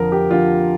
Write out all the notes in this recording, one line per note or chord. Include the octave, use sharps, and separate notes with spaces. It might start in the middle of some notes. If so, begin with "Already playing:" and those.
Already playing: F2 D3 F3 A#4
G4
F2 D3 F3 F4